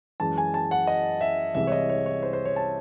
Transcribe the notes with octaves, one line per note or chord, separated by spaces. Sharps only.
F#2 E3 G#3 A5
G#5
A5
F#5
D#5
E5
C2 C3 E3 G#3 E5
C#5
D#5
C#5
C#5
C5
C5
C#5
A5